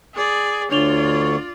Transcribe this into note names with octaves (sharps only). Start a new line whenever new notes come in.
G#4 D5
D2 D3 D4 F4 C#5 D5 F7 G7